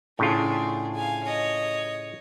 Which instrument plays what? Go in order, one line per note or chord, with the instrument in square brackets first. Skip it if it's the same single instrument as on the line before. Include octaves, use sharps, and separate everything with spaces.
[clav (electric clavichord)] A2 C#3 F4 [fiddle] D4 G#4
[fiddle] F5 G#5
C#5 D#5